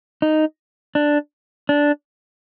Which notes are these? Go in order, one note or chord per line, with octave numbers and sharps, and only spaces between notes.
D#4
D4
D4